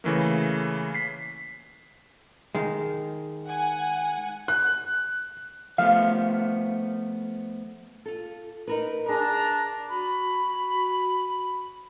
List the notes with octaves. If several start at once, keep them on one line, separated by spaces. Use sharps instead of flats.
C#3 E3 A3 A#3
B6 C7
D#3 G#3
F#5 G#5
F#6
F3 A3 B3 F5
F4 A4
D#4 A#4 B4
D4 G#4 A#4 A5 A#5
F#4 B5